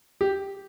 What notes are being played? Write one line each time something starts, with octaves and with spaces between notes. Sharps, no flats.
G4